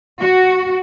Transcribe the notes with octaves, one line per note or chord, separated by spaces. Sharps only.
F#4